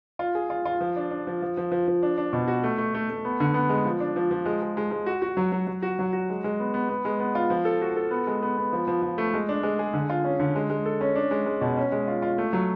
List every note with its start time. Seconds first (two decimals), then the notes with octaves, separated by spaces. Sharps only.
0.19 F4
0.35 G#4
0.50 F4
0.65 F4
0.81 F3
0.96 D4
1.11 D4
1.27 F3
1.42 F3
1.57 F3
1.72 F3
1.88 F3
2.02 D4
2.18 D4
2.33 B2
2.48 F#4
2.63 A3
2.78 A3
2.94 A3
3.10 A3
3.25 B3
3.40 D3
3.54 B3
3.69 G#3
3.85 F3
4.00 D4
4.16 F3
4.31 F3
4.45 G#3
4.62 G#3
4.77 G#3
4.91 G#3
5.06 F#4
5.22 F#4
5.37 F#3
5.52 F#3
5.67 F#3
5.82 F#4
5.99 F#3
6.13 F#4
6.29 G#3
6.44 G#3
6.60 B3
6.74 B3
6.89 B3
7.05 G#3
7.20 B3
7.35 F4
7.50 F3
7.65 A4
7.82 F#4
7.97 A4
8.11 B3
8.27 G#3
8.42 B3
8.58 B3
8.73 F3
8.87 F3
9.02 F3
9.18 A3
9.34 G#3
9.49 D4
9.63 G#3
9.79 G#4
9.93 D3
10.10 F4
10.24 C#4
10.40 D3
10.56 G#3
10.70 G#3
10.86 A4
11.01 C#4
11.15 D4
11.31 G#3
11.46 G#3
11.61 B2
11.77 C#4
11.92 G#3
12.08 F4
12.22 F4
12.38 A3
12.53 F#3